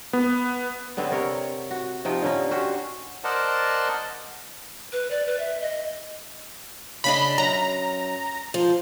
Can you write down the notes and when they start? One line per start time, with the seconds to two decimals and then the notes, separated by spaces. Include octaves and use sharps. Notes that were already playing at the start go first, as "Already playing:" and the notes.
0.13 B3
0.97 D3 B3 C4 C#5
1.11 C3 A#4 C#5
1.71 F#4
2.05 C3 F3 D#4 G5
2.22 D3 C#4 D#4
2.51 C#4 F#4 G4 C5
3.24 A#4 C5 D5 D#5 F#5 A5
4.92 B4
5.11 D5
5.26 B4
5.39 E5
5.60 D#5
7.04 C#3 D4 D#5 B5
7.38 F#2 A#5
8.54 F3